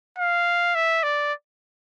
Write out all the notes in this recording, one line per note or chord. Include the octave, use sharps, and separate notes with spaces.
F5
E5
D5